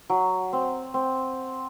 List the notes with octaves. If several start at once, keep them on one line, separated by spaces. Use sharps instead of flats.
F#3
C4
C4